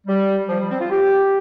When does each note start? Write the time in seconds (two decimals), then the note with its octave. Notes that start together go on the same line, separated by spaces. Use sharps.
0.07 G3
0.48 F3
0.59 G3
0.69 C4
0.80 F4
0.90 G4